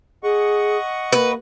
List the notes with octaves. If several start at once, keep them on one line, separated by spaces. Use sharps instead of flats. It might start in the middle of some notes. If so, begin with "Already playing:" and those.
G#4 D#5 F#5 C#6
A#3 B4